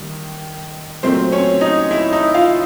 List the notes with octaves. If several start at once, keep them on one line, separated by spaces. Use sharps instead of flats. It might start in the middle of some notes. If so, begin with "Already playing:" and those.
Already playing: D#3 G3 A#3
A#2 F#3 A3 C4 C5
C#4 C#5
D#4 D#5
E4 E5
D#4 D#5
F4 F5